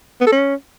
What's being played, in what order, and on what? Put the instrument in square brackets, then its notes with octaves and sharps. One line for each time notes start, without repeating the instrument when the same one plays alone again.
[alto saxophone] B3
A4
C#4